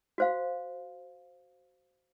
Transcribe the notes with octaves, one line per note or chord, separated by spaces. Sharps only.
F#4 C5 F5